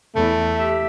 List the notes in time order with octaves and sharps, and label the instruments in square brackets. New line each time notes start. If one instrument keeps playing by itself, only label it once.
[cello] E2 [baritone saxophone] A3
[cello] G4 E5